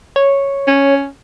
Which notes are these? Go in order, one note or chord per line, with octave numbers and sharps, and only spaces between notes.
C#5
C#4